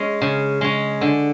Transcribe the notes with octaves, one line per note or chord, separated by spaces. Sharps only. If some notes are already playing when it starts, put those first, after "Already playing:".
Already playing: G#3 C#4
C#3
G#3 C#4
D3